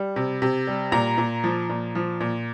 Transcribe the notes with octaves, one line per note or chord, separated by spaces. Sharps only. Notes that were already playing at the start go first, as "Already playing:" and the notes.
Already playing: G3
C3
C3
G3
A#2 A#5
A#2
F3
A#2
F3
A#2